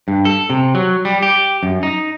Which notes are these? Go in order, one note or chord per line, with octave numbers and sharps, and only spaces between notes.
G2
A4
C3
F#3
G3
G4
F#2
D#4